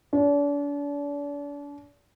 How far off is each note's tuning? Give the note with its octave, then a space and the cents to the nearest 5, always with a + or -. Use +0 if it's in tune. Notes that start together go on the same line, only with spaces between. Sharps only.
D4 -40